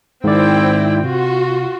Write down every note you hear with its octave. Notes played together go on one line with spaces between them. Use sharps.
G#2 D#3 C4 E4 D5 G5
C3 F4 F#4